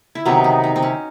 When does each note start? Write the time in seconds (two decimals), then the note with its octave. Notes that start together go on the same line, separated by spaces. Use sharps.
0.15 E4
0.25 C3 D#3 F#3 B3 D#4
0.44 D#4
0.64 D#4
0.76 C4
0.82 C#4